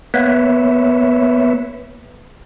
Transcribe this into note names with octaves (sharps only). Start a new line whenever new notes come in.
A#3 B3 B4 C#5 E5